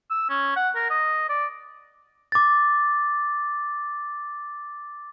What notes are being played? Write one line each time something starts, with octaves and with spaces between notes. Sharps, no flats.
E6
C#4
F#5
A#4
D#5
D5
D6 A6